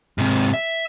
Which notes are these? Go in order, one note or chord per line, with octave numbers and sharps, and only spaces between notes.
G#2 C3
E5